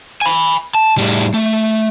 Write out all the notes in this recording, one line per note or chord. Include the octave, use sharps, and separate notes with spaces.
G#5 B5
A5
A2 G3
A3